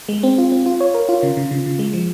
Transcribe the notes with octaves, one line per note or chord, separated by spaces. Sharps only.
G#3
C4
F4
C4
F4
C#5
A#4
F4
C#3
C#3
C#3
C#3
G#3
F3